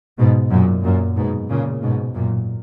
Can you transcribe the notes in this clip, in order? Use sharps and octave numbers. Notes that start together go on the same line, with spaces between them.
G#2 B2
F#2 A#2
F#2 A#2
G#2 B2
A#2 C#3
G#2 B2
F#2 A#2